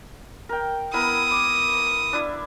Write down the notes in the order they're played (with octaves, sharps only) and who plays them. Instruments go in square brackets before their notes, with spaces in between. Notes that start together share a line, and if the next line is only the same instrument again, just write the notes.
[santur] A#4 G5
[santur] B3 E4 A#4 [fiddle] D#6
[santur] D6
D4 E4